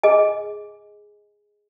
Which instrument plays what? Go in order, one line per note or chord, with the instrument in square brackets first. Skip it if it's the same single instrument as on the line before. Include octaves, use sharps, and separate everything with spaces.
[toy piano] G#4 D#5 G#5